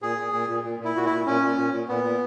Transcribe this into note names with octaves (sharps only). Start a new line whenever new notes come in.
A#2 G#4
A#2
A#2
A#2
A#2
A#2
E4
A#2 F#4
E4
A#2
A#2 C#4
A#2
A#2
A#2
A#2 B3
A#2